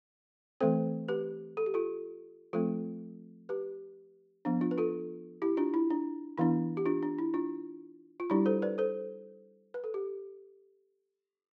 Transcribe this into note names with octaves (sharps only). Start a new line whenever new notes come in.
E3 A3 C4 A4 C5
G4 B4
A4
G4
F4 A4
F3 A3 C4 F4 A4
G4 B4
F3 B3 D4
D4 F4
B4
F4 A4
E4 G4
D4 F4
E4
D4
E3 B3 D4 E4
G4
D4 F4
D4
E4
D4 F4
F4
G3 D4 E4 G4
A4 C5
B4 D5
A4 C5
B4
A4
G4